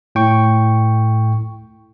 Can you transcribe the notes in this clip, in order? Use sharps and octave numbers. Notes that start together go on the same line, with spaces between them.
A2 G5 C#6